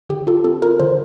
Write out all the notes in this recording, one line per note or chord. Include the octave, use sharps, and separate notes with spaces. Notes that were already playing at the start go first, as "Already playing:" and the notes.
D3 G4
F4 A4
C4 A4
F4 A#4
D3 C5